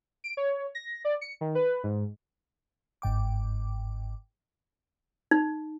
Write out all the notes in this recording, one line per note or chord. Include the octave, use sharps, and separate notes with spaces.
D7
C#5
A#6
D5
C#7
D#3
B4
G#2
G1 G#2 G5 D6
D#4